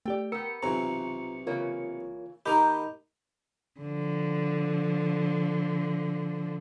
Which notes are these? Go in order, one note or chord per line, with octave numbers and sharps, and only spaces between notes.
A3 G4 D5 G5
B3 G4 A#4 E6 C#7
B1 C3 E3 F4 A#5
C#3 E3 A#3 F4 A#4 C#5
D#3 A#3 D#4 G4 A#4 D#5 B5 G6
D3 F3